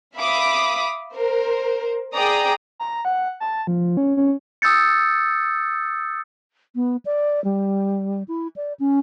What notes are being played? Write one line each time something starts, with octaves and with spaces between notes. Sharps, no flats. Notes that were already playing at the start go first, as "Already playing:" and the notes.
E5 F5 B5 D6 D#6
A#4 C5
G#4 D5 G5 A#5 D#6
A#5
F#5
A5
F3
C#4
C#4
D#6 E6 G6 A6 C#7
B3
D5
G3
E4
D5
C#4